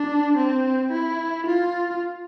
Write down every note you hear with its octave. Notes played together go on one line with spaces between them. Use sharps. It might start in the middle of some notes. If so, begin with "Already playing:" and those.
Already playing: D4
C4
E4
F4